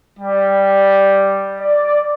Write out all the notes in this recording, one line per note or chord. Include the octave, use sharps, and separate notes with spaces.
G3
D5